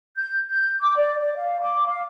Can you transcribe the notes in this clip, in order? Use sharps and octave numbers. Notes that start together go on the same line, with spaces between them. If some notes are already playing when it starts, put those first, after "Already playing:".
G6
G6
D6
D5
D5
F5
D6
F5